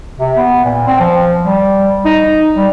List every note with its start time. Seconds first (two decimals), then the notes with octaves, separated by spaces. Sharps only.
0.19 C3
0.37 B3
0.64 A#2
0.87 C4
1.00 F3
1.43 G3
2.05 D#4
2.56 G3